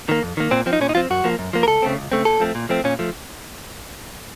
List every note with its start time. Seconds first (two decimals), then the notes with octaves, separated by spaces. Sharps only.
0.09 D#3 A#3
0.23 F2
0.37 D#3 A#3
0.51 A#2 C4
0.66 F3 C4
0.73 D#4
0.80 A#2 C#4
0.89 D#4
0.95 F3 C4 F4
1.10 F#2 F#4
1.24 F3 A#3
1.39 F#2
1.53 F3 A#3
1.63 A#4
1.67 C#2 A4
1.82 C#3 A3 C4
1.97 C#2
2.12 C#3 A3 C4
2.25 A#2 A4
2.40 F3 A3 C4
2.55 A#2
2.69 F3 A3 C4
2.84 A#2 C#4
2.99 F3 A3